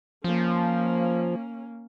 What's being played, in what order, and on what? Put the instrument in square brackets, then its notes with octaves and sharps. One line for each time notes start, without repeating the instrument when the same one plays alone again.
[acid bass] F3 [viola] A#3 C#4